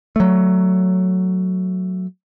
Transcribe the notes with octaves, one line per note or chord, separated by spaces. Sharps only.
F#3 A3